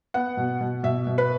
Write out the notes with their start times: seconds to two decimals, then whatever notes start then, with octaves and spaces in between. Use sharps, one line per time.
0.14 B3 F#5
0.37 B2
0.61 B2
0.83 B2 E5
1.07 B2
1.18 B4